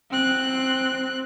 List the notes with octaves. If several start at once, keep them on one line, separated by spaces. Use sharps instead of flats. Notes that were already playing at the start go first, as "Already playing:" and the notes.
C4 F#6